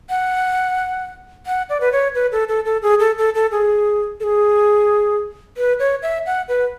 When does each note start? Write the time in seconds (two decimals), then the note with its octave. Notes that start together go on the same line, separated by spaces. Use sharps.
0.10 F#5
1.46 F#5
1.69 D5
1.80 B4
1.92 C#5
2.15 B4
2.32 A4
2.49 A4
2.65 A4
2.83 G#4
3.00 A4
3.18 A4
3.35 A4
3.52 G#4
4.20 A4
4.24 G#4
5.57 B4
5.80 C#5
6.02 E5
6.26 F#5
6.49 B4